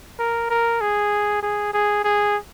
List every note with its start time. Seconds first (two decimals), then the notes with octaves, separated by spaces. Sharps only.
0.19 A#4
0.50 A#4
0.81 G#4
1.42 G#4
1.73 G#4
2.04 G#4